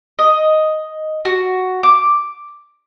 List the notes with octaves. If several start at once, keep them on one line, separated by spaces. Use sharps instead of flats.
D#5
F#4
D6